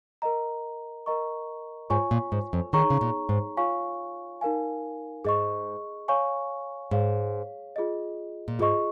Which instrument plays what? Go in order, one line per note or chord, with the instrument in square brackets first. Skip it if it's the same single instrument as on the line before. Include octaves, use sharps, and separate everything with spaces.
[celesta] A#4 D#5 A#5
A#4 D#5 A#5 C#6
[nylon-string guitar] G#2 [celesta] F4 C#5 G#5 C#6
[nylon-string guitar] A#2
G#2
F2
[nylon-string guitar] D#3 [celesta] D#4 G#4 C#5 A#5 C#6
[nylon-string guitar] C#3
A#2
G#2
[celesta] F4 C#5 F5 G#5 C#6
D#4 A#4 F5 G#5
[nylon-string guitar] G#2 [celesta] G#4 D#5 C#6
[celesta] C#5 F5 G#5 C#6
[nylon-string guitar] G#2 [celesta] G#4 C#5 F5
[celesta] F4 G#4 D#5
[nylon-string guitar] A#2
[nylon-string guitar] G#2 [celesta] F4 G#4 D#5 C#6